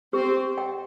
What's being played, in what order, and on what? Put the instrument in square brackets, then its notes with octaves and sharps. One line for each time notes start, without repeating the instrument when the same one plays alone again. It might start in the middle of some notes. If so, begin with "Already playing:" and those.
[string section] C4 C5 [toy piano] G4
[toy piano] G5